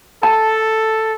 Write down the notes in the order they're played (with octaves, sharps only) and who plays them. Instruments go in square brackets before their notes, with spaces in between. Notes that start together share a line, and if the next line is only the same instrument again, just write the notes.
[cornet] A4 [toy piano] A5